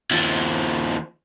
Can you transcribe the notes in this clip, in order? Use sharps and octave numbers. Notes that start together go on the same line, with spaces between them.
D#2 F3